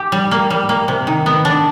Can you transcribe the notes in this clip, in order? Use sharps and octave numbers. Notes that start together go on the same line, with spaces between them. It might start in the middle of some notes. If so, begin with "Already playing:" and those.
Already playing: G4
G3
A#3
G3
A#3
C3
D#3
B3
D4